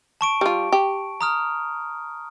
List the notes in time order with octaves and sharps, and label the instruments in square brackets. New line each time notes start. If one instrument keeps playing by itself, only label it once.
[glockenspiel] A5 C#6 D7
[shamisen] G3 F4
G4
[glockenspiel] A#5 D#6 F6